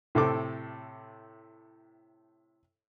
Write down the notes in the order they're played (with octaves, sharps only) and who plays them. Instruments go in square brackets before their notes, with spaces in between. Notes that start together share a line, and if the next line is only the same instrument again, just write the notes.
[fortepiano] A2 C3 A4 D6